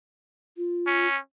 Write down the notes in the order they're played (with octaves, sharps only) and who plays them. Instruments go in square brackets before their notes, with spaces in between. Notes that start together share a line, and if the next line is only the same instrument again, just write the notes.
[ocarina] F4
[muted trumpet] C#4